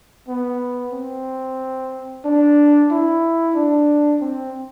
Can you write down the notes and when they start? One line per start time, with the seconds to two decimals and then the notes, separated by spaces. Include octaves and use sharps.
0.29 B3
0.93 C4
2.25 D4
2.91 E4
3.55 D4
4.21 C4